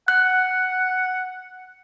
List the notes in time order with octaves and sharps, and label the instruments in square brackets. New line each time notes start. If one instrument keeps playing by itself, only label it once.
[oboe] F#5 [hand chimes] F#6